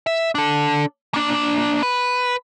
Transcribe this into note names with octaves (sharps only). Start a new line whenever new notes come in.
E5
D4 A4
A#3 D4
B4